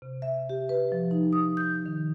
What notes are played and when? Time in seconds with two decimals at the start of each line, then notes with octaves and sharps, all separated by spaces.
0.02 C3
0.22 E5
0.50 G4
0.69 B4
0.92 F3
1.11 D#4
1.33 D#6
1.57 G6
1.86 D#3